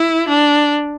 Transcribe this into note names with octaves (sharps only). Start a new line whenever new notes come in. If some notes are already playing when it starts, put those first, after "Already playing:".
Already playing: E4
D4